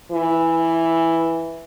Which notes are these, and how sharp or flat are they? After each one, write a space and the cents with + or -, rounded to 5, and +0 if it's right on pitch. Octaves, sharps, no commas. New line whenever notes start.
E3 +0